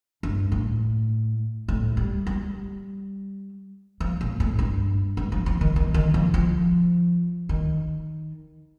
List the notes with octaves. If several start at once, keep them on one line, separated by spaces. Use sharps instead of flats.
G2
A2
A2
G3
G3
F3
A#2
A2
G2
G2
F3
F3
D#3
D#3
D#3
F3
F3
D#3